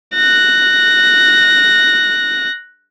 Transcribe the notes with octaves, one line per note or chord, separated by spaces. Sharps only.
F#6 A#6